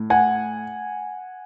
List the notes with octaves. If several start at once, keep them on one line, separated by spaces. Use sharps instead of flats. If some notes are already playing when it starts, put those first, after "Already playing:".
Already playing: A2
F#5 G#5